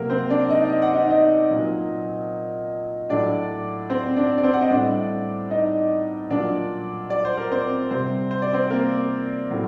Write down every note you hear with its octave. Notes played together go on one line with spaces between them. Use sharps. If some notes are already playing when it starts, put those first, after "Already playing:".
Already playing: C3 F#3 A#3 A#4
C4 C5
D4 D5
D#4 D#5
D#5
F#5
D#4 D#5
D#4 D#5
A#2 F#3
A2 F#3 D4 D5
C4 C5
D4 D5
D5
C4 C5
F#5
D#5
A2 G3 D4 D5
D#4 D#5
A#2 F#3 D4 D5
D5
C5
A#4
C4 C5
C3 G3 C4 C5
C5
D5
C4 C5
A#3 A#4
A2 F#3